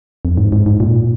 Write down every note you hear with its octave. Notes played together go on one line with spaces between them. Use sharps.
F2
G#2
G#2
G#2
A#2